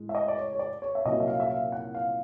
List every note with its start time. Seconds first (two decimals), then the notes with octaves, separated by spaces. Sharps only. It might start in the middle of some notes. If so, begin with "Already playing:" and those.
Already playing: A2 G#3
0.09 E5
0.15 D#5
0.28 D5
0.38 C#5
0.53 C#5
0.59 D5
0.82 C#5
0.95 E5
1.05 C2 A#2 F#3 A#3 C#4 D#5
1.20 E5
1.27 F5
1.40 E5
1.50 F5
1.72 F#5
1.95 F5